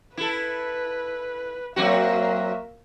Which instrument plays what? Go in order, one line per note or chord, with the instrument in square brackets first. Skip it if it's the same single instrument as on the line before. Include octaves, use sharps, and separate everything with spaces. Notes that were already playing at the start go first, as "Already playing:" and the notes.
[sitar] E4 A4 [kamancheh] B4
[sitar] F#3 C4 F#4 [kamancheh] A#3 E5